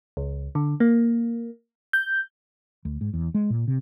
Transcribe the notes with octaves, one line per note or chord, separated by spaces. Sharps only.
C#2
D3
A#3
G6
D2
G#2
E2
G#3
A#2
C3